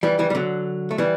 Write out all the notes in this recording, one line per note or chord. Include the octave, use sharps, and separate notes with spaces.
E3 G3
E3 G3
G3
D3 F#3
A3
E3 G3